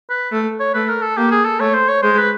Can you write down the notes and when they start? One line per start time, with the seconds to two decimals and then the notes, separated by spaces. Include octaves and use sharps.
0.10 B4
0.32 A3
0.60 C#5
0.74 A3 B4
0.89 A#4
1.02 A4
1.17 A#3 G4
1.31 G#4
1.45 A4
1.60 A3 C#5
1.74 C5
1.89 C#5
2.03 G#3 C5
2.17 B4